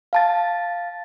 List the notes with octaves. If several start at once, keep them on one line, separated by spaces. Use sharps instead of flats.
F5 A5 A6